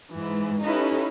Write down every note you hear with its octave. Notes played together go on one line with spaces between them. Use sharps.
G#2 E3
C#4 D#4 E4 G4 A4 B4